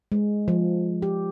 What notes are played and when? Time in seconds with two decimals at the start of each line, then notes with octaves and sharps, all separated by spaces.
0.12 G#3
0.48 F3
1.02 G4